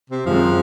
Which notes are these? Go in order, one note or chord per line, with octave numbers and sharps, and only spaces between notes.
C3
F#2 D#3 F3 G#3 C4